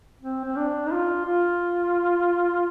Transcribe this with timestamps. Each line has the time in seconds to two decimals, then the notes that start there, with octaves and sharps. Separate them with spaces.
0.22 C4
0.45 C4
0.57 D4
0.87 D#4
0.91 F4
1.26 F4